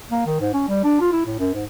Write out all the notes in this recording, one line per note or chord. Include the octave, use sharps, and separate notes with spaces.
A#3
D#3
G#2
C#4
G3
D4
F4
E4
A2
F#2
G#2